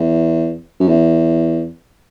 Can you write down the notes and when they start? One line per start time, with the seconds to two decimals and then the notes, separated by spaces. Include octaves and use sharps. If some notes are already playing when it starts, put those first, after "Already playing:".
Already playing: E2
0.80 F#2
0.88 E2